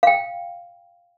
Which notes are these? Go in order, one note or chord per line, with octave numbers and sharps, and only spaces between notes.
F5 G5